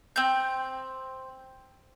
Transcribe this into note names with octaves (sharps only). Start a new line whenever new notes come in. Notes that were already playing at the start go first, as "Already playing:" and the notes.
C4 G6